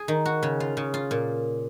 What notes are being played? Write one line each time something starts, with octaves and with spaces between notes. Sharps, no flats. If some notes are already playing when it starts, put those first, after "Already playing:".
Already playing: G#4
D#3
F#4
C#3
F4
C#3
F4
A#2